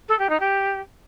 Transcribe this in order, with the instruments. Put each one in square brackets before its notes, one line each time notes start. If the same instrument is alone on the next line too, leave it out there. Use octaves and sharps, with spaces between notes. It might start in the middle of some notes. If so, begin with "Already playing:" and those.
[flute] A4
G4
D#4
G4